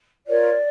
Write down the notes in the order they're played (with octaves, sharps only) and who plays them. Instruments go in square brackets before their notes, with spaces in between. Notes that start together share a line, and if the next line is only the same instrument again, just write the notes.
[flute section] F4 A#4 C#5 D5